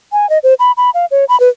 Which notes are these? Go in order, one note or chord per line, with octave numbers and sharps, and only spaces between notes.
G#5
D#5
C5
B5
B5
F5
C#5
B5
B4